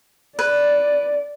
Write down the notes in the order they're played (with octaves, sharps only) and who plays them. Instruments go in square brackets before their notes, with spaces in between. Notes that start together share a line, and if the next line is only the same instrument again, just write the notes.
[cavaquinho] B4 [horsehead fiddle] D5